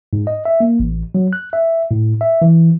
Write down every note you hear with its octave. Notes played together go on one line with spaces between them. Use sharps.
G#2
D#5
E5
A#3
A1
F#3
F#6
E5
A2
E5
E3